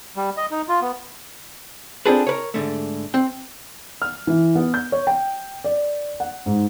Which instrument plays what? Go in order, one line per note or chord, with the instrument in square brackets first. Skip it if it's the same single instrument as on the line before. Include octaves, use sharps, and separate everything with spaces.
[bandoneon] G3
D#5
D#4
F4
B3
[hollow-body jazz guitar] C4 D4 F4 G#4 A4 B4
A#4 B4 C#5
G#2 D3 A3
C4 G5
[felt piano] F6
E3
B3
G6
C#5
G5
D5
F#5
G#2